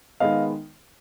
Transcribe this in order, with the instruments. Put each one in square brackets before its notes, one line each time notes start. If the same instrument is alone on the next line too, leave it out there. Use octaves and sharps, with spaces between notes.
[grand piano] D#3 G#3 B3 D#5 F5